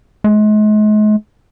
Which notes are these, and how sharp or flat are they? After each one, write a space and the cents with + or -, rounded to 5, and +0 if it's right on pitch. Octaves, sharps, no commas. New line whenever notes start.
G#3 +40